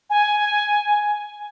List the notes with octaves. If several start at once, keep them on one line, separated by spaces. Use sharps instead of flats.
G#5